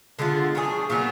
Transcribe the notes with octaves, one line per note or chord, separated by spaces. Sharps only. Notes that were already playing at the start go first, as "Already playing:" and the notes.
D3 G#3 B3 F4
D#3 F#3 D4 G#4
A#2 F#3 B3 D4